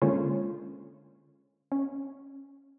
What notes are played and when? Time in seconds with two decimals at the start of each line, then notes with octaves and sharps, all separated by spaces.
0.02 D3 G#3 A#3 C#4 F4 C5
1.72 C#4